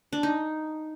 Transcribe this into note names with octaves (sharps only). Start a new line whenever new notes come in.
D4
D#4